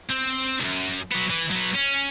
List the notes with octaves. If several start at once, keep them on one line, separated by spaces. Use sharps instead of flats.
C4
C#2 F#2
F#3 B3
E3
F#3 B3
C#4